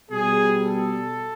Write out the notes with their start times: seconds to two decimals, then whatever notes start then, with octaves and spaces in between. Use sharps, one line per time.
0.11 B2 G3 G#4
0.60 A4